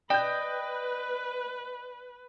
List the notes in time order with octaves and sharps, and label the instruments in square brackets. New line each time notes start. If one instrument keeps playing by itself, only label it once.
[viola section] B4 [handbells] D5 [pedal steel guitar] D#5 [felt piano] G5 G6